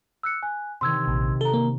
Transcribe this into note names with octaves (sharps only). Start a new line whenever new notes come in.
E6 F#6 C#7
G#5 F#6
C3 D#3 C6 E6 G#6
A#1
A4 A#5 G7
A#3